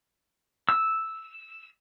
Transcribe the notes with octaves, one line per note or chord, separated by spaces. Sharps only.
E6